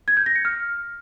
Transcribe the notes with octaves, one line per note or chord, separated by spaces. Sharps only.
G#6
G6
A#6
C#7
F6